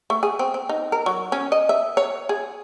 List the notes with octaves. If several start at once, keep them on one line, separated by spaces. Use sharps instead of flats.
A3
G#4
C4
C4
D#4
A#4
F#3
C#4
D#5
E5
C#5
G#4